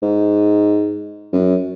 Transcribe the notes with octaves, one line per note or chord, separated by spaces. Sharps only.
G#2
F#2